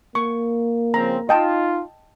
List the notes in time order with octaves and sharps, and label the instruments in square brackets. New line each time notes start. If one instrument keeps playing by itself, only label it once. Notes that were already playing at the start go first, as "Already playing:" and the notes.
[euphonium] A#3 [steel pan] C#6
[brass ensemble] C#3 F3 C4 [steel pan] A#5
[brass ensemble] D#4 F4 [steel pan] D#5 G5 A5